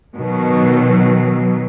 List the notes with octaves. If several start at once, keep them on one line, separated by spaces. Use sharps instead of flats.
B2 D#3 F#3